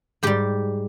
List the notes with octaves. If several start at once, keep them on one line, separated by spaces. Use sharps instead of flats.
G#2 G3 G4